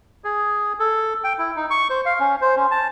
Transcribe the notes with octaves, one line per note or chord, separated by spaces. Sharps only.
G#4
A4
G5
E4
D#4
C#6
C5
F5
C#4
C5
C#4
A5